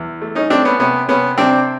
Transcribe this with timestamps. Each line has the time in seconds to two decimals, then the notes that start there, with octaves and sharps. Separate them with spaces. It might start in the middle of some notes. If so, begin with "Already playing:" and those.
Already playing: E2
0.22 A3
0.35 C#4 D#4
0.50 A3 C4 D4
0.65 B3 C#4
0.79 C3 B3 C#4
1.08 C3 B3 C#4
1.37 C3 C4 D4